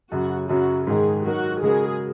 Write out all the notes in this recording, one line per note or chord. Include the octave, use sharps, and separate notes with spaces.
F#2 C#3 F#3 F#4
F#2 C#3 F#3 C#4 F#4
G#2 D#3 G#3 G#4
F#3 D#4 F#4 A#4
C#3 G#3 F#4 G#4 A#4